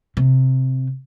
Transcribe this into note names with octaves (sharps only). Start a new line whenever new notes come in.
C3